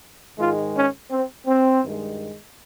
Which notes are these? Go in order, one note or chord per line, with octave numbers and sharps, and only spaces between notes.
G#2 D#3 G#3 F4
C#4
C4
C4
G2 D#3 G#3